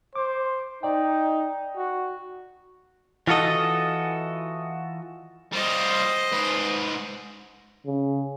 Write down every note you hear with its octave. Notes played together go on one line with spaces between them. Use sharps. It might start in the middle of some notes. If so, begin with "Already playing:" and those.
C5 D6
D#4 D5 G5
F#4
E3 F4 F#4 A4 D#5
G3 F4 C5 D#5
G#2 B4
C#3